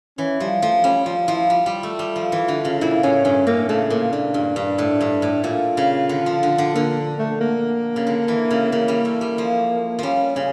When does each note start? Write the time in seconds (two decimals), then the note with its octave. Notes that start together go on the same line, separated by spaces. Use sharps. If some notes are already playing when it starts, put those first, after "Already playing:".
0.18 E3 C#4
0.40 F3 G3
0.62 F3 A3
0.84 G3 C#4
1.06 F3 F4
1.28 F3 E4
1.50 G3 F4
1.66 G3
1.83 A3
1.99 G3
2.16 F3
2.32 E3
2.48 D3
2.65 C#3
2.81 A#2 E4
3.03 A2 C#4
3.25 G2 C#4
3.47 A2 A#3
3.69 C#3 A3
3.90 A#2 A#3
4.13 A#2 D4
4.34 G2
4.56 G2
4.78 A2
5.01 G2
5.22 A2
5.44 A#2 F4
5.77 C#3
6.09 D3
6.26 F3
6.43 D3
6.58 D3
6.75 D3 A#3
7.19 A3
7.41 A#3
7.96 C#3
8.07 D3
8.28 E3
8.50 C#3
8.72 C#3 A#3
8.88 G3
9.05 A3
9.21 G3
9.38 F3
9.99 F3 G3 C#4
10.36 C#3 C#4